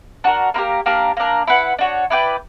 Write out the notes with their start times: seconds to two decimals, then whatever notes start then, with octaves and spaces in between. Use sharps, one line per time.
0.24 D4 F#4 A#4
0.54 A#3 E4 G4 A#4
0.86 A#3 D4 G4 A#4
1.17 A#3 D4 A#4
1.47 E4 B4 F#5
1.79 D4 F#4 C#5
2.10 E4 B4 D5 G5